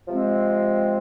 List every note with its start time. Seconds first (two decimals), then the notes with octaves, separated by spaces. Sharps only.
0.07 C3 F3 G#3 C4